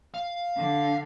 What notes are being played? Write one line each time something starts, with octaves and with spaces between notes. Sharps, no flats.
F5
D3